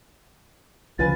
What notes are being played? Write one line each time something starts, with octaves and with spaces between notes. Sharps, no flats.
D2 C#3 F3 F4 B4 G#5 A6